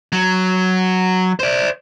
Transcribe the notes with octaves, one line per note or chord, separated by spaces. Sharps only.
F#3
C5 D5